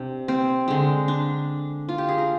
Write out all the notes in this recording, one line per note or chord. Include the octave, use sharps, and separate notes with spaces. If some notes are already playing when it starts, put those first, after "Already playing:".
Already playing: C3 D4
C4
D3 G#3
D4
F4
G4
G#4
A#4